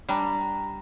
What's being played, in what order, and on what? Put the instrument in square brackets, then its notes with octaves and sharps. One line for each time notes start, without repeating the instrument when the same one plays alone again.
[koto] G3 D4 [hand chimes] A#5 B5